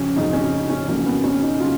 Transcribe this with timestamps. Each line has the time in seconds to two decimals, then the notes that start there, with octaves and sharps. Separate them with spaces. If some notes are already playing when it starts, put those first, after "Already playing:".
Already playing: F2 C#3 F#3 C#4
0.16 F2 C#3 F#3 D#4
0.33 C#4
0.52 D#4
0.70 C#4
0.88 F2 C#3 F#3 A#3
1.06 B3
1.24 C#4
1.42 D#4
1.60 C#3 F#3 F4